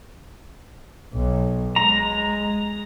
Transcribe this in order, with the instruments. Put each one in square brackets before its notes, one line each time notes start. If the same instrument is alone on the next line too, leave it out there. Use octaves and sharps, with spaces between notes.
[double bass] B1
[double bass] G#3 [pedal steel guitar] A#5